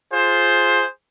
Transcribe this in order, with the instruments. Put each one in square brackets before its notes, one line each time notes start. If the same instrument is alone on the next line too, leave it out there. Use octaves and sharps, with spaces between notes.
[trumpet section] F4 G#4 C5